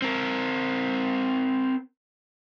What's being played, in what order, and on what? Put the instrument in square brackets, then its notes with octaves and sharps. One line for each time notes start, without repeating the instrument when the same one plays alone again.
[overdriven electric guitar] C4 A#4